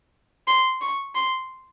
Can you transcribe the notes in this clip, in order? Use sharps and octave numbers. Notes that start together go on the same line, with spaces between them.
C6
C#6
C6